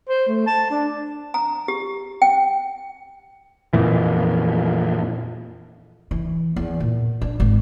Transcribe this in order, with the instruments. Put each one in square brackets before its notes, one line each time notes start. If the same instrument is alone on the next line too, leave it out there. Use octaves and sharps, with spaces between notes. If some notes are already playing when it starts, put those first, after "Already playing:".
[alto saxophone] C5
A3
A5
D4
[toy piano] A#5
G4
G5
[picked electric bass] F2 A#2 E3
[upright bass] E3
E2
A#2
D4
G#1